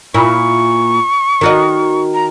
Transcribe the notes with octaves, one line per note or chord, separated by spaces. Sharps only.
A#2 E4 C#6
D#3 F#4 D#5
A#5